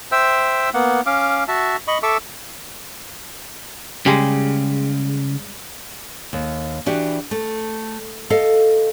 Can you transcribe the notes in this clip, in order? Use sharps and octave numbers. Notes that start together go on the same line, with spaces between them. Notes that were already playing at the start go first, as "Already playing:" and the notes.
C5 E5 G5 E6
A#3 B3 F#5
C#4 F5 D6
F#4 E5 A5
D#5 B5 C#6
A4 E5 C#6 D6 E6
C#3 G3 G#3
D#2
E3 D4 F#4 G4
A3
A4 D#5 F5